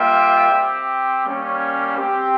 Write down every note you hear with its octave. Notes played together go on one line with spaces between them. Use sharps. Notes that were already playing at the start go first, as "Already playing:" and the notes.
Already playing: G3 A#3 F4 E5 G5
C4 G4
G3 A#3 C#4
C4 G4